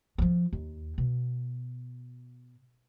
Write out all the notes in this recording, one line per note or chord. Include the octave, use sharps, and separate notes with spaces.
F3 F#3
D#2
B2